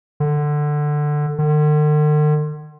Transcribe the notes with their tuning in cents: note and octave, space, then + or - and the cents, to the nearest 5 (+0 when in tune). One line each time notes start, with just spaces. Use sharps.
D3 +15
D3 +45